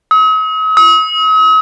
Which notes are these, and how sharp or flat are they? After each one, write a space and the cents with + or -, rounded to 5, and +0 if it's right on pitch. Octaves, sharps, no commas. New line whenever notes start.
D#6 +45
D#6 +45